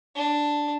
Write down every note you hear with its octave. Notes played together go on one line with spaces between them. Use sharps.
D4